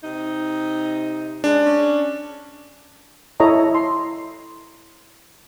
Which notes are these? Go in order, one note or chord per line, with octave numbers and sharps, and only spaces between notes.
C3 D#4
G#3 D4
C#4
E4 A4 C#5 D#5 A#5
C6